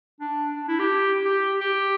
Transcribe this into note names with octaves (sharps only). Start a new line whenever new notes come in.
D4
D4
E4
G4
G4
G4